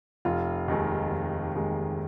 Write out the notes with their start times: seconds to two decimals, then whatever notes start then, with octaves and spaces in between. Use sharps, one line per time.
0.25 F1 F4
0.68 D#2 D#3 G#3
1.12 F1
1.55 D#2 D#3 G#3